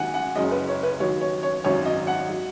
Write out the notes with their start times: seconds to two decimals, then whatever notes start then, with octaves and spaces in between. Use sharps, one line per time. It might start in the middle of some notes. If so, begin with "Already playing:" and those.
Already playing: D#2 D#3 F#3 F#5 G#5
0.14 F#5
0.35 F#1 F#2 C#3 D#5
0.51 B4
0.68 C#5
0.83 B4
1.00 D#2 D#3 F#3 C#5
1.21 C#5
1.43 C#5
1.64 G#1 F#2 F#3 C#5
1.85 D#5
2.07 F#5
2.29 F#3